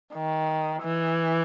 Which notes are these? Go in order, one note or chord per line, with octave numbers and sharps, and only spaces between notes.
D#3
E3